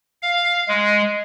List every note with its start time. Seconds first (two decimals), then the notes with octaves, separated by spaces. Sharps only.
0.22 F5
0.68 G#3